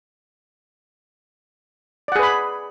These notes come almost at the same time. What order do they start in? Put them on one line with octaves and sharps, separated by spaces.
D5 F#5 G#4 B4 B5